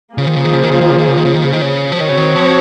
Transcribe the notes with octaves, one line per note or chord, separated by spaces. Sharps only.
C#3 F3 A#3 F4 G#4 C5
D#3
C#3
D#3
C#3
D#3
C#3
D#3
C#3
D#3
C#3
D#3
C#3
D#3
C#3
D#3
C#3
F3 C4 F#4 C#5
D#3
C#3
D#3
F3